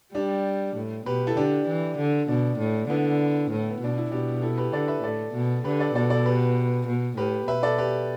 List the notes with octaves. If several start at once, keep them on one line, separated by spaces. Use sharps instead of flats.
G3 D4 G4
A2
B2 G4 B4
E4 A4
D3 D4 G4
E3
D3
B2 D4
A2
D3 B3 E4
A2
B3
B2 D4
E4
B2 D4 G4
G4
E4 A4
G4 B4
D3 A4 D5
B4 E5
A2 A4 D5
B2
D3 G4 B4
A4 D5
B2 A4 D5
A4 D5
G4 B4
B2
A2 G4 B4
B2 B4 E5
A4 D5
G4 B4